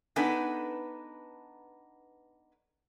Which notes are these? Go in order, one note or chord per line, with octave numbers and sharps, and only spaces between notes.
B3 D4 D#4 A4 B4 G#5